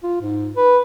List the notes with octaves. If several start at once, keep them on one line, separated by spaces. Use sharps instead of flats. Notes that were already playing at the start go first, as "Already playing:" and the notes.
F4
G#2
B4